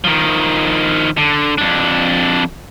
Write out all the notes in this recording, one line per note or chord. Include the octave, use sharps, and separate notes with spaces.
D#3 F3
D3
F2 D4